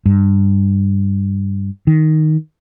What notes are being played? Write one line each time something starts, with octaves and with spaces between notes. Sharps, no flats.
G2
D#3